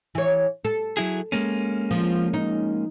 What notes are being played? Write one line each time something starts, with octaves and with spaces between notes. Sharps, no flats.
E3 C#5
A4
F#3 E4 G#4
G#3 A#3 C#4
F3
D#4